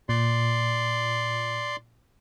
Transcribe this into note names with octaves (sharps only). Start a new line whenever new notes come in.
A#2 D5 C6